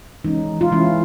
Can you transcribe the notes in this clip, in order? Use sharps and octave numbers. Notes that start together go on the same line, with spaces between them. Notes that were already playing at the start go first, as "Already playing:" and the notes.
E3 G#3 C#4 D#4
F4
E3 G#3 C#4 E4